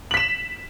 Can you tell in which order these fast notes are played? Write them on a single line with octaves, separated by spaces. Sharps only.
F#7 B6 E7